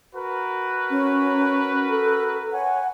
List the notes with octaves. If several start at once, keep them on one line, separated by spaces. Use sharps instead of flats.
F#4 A#4 B4
C#4
A4
C#5 F#5 G#5